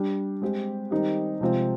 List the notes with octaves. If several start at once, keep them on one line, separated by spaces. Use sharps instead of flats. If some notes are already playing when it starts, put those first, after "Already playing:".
Already playing: G3 D4 G4
G#3 C4 G4
D#3 G3 C4 D#4 G4
C3 F3 G#3 C4 F4